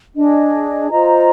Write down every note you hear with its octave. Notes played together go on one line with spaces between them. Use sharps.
D4 G#4 D#5
F4 C5 D#5 A#5